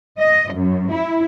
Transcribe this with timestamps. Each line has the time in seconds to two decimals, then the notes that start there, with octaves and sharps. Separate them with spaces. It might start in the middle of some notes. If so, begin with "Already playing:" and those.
0.19 D#5
0.53 F#2
0.91 E4